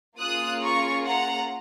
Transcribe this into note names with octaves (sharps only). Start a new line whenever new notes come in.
A#3 C#4 F4 G#4 D#6 F#6
A#5 C#6
F#5 A#5